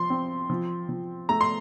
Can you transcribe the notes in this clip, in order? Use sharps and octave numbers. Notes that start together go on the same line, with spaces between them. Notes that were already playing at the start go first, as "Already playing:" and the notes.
Already playing: F3 C6
C4
F3
F3
A3 A#5
C6